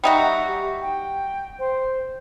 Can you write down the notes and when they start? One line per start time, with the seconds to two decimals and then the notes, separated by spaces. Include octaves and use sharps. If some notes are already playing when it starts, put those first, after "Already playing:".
0.04 G3 D#4 F#4 E5
0.47 G4
0.82 G5
1.59 C5